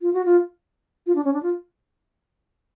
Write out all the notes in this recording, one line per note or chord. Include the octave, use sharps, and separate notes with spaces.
F4
F#4
F4
F4
D4
C#4
D4
F4